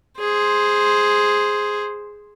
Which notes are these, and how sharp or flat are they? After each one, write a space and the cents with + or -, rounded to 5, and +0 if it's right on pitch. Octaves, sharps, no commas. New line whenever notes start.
G#4 +0 C5 +0